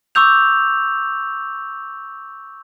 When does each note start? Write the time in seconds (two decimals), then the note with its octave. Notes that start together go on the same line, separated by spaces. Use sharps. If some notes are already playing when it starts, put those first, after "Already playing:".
0.15 C#6 D6 E6 G6 F7